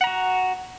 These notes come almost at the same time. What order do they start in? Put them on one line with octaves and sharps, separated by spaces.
F#5 A#5 F#4